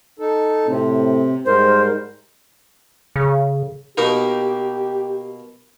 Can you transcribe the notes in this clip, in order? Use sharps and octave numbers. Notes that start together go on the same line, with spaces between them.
D#4 A4
A2 C3 C4
G#2 G3 A#4 C5
C#3
B2 A#3 D#4 G4